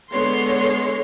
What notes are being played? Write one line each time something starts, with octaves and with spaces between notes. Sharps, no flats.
D3 G#3 B3 C#5 C6